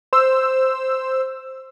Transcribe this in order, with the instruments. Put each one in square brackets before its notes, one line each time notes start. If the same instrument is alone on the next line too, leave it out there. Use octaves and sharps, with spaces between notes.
[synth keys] C5 E6